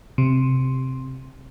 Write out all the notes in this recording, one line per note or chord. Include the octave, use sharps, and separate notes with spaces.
C3